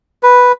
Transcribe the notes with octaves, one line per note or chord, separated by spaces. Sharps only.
B4